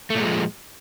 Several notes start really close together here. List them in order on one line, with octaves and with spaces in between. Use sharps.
A3 A#2 G#3 F3